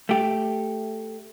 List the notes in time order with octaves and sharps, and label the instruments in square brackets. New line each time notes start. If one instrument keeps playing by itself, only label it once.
[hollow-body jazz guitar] A3 G4